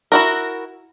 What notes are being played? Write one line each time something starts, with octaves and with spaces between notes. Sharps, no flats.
E4 F#4 A#4